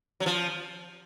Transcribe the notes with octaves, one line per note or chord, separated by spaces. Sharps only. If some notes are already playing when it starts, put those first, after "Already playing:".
F#3
F3